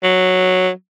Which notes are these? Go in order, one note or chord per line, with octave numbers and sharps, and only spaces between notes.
F#3